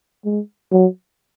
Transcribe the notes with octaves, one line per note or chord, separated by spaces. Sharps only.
G#3
F#3